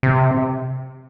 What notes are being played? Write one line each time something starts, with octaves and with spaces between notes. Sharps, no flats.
C3